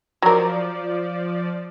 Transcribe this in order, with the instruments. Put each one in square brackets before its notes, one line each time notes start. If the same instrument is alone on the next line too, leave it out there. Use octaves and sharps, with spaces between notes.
[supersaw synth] F3 D5 [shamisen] F#3 A#4